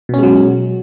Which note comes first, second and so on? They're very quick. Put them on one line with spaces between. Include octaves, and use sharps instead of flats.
B2 C#4 G#3 F#3